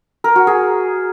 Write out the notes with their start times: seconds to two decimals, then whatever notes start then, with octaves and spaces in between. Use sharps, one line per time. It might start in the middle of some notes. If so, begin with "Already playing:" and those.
0.24 A#4
0.36 F#4
0.47 G#4